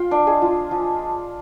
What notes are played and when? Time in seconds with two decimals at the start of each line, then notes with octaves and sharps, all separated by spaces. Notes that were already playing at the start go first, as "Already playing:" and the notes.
Already playing: F4 F5 G5
0.11 D4 D5
0.27 G#3 G#4
0.42 F3 F4
0.71 F3 F4